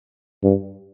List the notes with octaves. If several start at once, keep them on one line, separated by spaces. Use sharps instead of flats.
G2